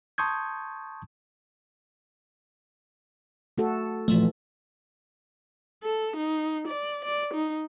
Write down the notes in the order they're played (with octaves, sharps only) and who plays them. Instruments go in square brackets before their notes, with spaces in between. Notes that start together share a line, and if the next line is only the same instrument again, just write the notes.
[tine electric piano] A5 C6 C#6 D#6 G6 G#6
[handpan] A3 F#4 A4
[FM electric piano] A#2 F3 A3 [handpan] E3
[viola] A4
D#4
D5
D5
D#4